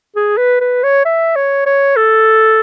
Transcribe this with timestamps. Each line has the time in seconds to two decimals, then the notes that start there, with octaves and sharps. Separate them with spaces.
0.16 G#4
0.38 B4
0.61 B4
0.84 C#5
1.05 E5
1.36 C#5
1.66 C#5
1.96 A4